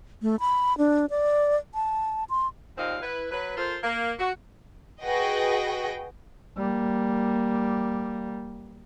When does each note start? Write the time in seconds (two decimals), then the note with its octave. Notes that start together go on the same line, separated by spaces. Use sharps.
0.22 A3
0.40 B5
0.78 D4
1.10 D5
1.75 A5
2.30 C6
2.78 D#2 A#2 C4 D#4 F5
3.02 E4 B4
3.31 F#3 B4
3.57 F4 A4 A#4 C5
3.83 A#3
4.19 F#4
5.02 F#4 G#4 B4 D#5 G5 A#6
6.58 G3 A#3